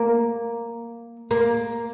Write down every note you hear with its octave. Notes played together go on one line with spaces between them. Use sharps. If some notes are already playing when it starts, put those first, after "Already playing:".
Already playing: A#3
A#3